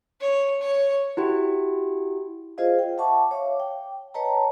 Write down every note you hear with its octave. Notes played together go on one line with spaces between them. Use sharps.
C#5
C#5
E4 F#4 G4
F4 G#4 C5 D#5 F5
G5
E5 F#5 A5 C#6 D6
C#5 E5 F5 D6
G5
B4 C#5 D#5 G5 A5 A#5